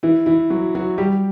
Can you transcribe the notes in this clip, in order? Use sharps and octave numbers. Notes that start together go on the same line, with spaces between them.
E3 E4
E3 E4
F#3 F#4
F#3 F#4
G3 G4